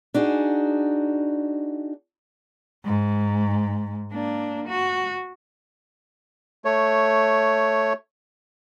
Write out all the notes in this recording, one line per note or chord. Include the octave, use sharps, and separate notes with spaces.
D4 D#4 F#4 G#4
G#2
A#3 D4
F#4
A3 C#5